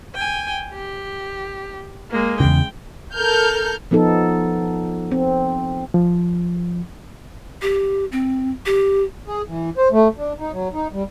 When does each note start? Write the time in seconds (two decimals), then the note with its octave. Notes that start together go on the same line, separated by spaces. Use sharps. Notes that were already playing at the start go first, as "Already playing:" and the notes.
0.15 G5 G#5
0.73 G4
2.11 G#3 A#3
2.40 E2 C#3 G5
3.14 A4 A#4 F6 G6
3.91 F3 B3 D#4 A4
5.12 C4
5.94 F3
7.62 G4
8.12 C4
8.66 G4
9.28 G#4
9.48 E3
9.78 C5
9.92 A3
10.18 D4
10.40 D#4
10.52 F#3
10.74 D#4
10.93 G3